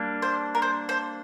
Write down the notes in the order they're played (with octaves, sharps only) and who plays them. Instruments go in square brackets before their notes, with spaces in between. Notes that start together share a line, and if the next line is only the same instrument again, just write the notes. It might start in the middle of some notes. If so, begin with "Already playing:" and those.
Already playing: [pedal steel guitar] G3 A#3 D4
[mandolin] C5
A#4
C5
C5